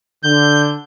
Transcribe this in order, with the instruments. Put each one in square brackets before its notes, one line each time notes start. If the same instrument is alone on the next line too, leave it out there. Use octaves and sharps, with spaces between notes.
[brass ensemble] D3 [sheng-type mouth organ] G6